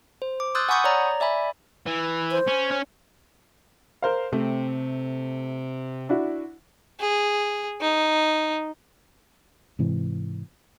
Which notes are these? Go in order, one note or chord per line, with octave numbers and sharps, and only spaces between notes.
C5
D6
C6 D#6 E6 F#6 G6 A6
F#5 G#5 B5 C#6 D#6 G6
C#5 D5 A#5
D5 E5 G#5 B5
E3
C5
C#4
C#4
A#4 C5 F5
C3 A3
D4 E4 F#4
G#4
D#4
G#2 C3 E3